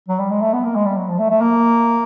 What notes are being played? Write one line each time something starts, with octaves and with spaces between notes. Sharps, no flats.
F#3
G3
G#3
A3
B3
A#3
G#3
G3
F#3
F3
A3
A3
A#3